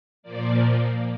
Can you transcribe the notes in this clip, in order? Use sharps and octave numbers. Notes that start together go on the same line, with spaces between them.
A#2 F3 A#3 D5